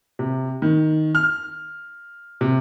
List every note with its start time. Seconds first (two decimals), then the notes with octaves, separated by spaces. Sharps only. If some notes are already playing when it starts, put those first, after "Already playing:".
0.19 C3
0.62 D#3
1.15 F6
2.41 C3